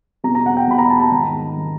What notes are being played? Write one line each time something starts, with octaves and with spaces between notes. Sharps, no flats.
E2 B2 A#5
A#5
F#5
G5
E2 B2 B5
A#5
A5
A#5
G#2 D#3 A#5
D#3